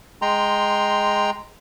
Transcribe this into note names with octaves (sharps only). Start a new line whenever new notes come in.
G#3 G5 A#5 C6